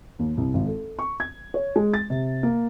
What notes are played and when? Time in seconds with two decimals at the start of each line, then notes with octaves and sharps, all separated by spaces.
0.19 D#2
0.37 C2
0.54 G#1
0.67 A4
0.99 C#6
1.20 G#6
1.54 C#5
1.76 G#3
1.94 A6
2.10 C3
2.43 A#3